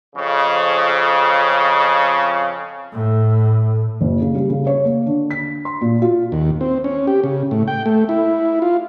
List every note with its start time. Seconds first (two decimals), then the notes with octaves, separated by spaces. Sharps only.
0.16 F2 C#3
2.93 A2
4.01 F#1
4.21 C#3
4.35 G3
4.50 C#3
4.67 C#5
4.85 A#3
5.06 D3
5.31 B6
5.65 C6
5.81 A#2
6.02 F4
6.32 D#2
6.61 C4
6.84 C#4
7.07 G4
7.24 C#3
7.51 A2
7.68 G5
7.86 A3
8.09 E4
8.62 F4